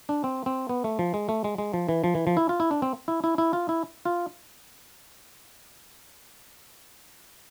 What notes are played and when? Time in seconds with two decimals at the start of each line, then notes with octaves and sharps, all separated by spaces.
0.09 D4
0.24 C4
0.46 C4
0.69 B3
0.84 A3
0.99 F3
1.14 G#3
1.29 A3
1.44 G#3
1.58 G#3
1.73 F3
1.89 E3
2.04 F3
2.15 E3
2.27 F3
2.37 E4
2.49 F4
2.60 E4
2.71 D4
2.82 C4
3.08 E4
3.24 E4
3.38 E4
3.53 F4
3.69 E4
4.05 F4